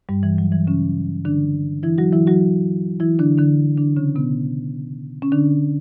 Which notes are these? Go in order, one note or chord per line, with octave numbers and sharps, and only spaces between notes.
G2 G3
E3
F#3
E3
C#3 C#4
D3 D4
E3 E4
F#3 F#4
E3 E4
F#3 F#4
E3 E4
D3 D4
D3 D4
D3 D4
C#3 C#4
B2 B3
C#4
D3 D4